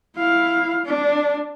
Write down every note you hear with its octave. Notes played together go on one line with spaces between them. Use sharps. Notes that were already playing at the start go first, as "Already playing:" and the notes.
E4 F5
D4